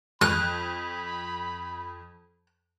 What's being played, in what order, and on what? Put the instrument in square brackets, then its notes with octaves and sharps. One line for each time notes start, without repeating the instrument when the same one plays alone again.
[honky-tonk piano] F2 [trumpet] B5 [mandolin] F#6